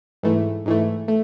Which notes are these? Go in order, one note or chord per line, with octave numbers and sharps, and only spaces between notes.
G#2 E3 A3
G#2 E3 A3
A3